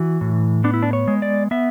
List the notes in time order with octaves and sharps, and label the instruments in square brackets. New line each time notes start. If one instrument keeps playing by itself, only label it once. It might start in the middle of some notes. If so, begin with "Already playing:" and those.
Already playing: [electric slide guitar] E3 F#4
A2
B3 D4
E4
D4
C#5
G#3
D5
B3 E5